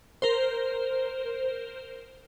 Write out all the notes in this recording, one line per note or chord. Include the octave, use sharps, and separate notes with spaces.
A#4 C5